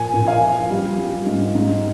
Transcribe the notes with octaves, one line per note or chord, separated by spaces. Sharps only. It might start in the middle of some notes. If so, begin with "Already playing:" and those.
Already playing: A#2 F3 G#5
A#2
F5 G#5
F3
G3
G3
G#2
G#2